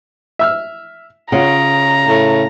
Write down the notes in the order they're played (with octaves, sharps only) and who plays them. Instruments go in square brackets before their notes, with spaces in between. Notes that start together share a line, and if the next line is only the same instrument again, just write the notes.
[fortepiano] E5 E6 F6
[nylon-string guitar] C#3 [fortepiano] F4 C#5 F#5 [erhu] A#5
[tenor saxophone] A2